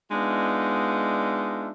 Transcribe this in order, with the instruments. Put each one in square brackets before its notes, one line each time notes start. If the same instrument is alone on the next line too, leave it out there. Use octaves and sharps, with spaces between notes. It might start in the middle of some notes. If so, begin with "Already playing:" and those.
[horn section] G#3 B3 D4 D#4 F4 E5